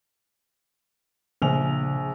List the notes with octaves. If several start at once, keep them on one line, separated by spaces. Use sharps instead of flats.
A#1 C#3 F7